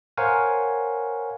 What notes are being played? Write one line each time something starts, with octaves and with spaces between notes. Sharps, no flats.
A#4 C5 C#5 F5 F#5 G#5